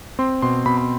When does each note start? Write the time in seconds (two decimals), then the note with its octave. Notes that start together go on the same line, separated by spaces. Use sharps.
0.19 C4 C6
0.42 B2 C6
0.66 B2 B5
0.77 B5